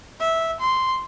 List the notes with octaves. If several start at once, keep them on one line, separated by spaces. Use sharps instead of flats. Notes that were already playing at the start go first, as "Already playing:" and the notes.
E5
C6